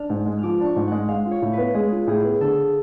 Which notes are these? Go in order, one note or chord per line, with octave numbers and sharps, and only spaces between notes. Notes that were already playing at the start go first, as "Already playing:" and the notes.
Already playing: D4 F6
G#2
G#3
F3 D6 F6
D4 C#6
G#2
G#3 F#5
G#3 F5
F4
C#5
A2
B4
B3
G#3 G#4
F4
A2 G#4
B3
D3 A4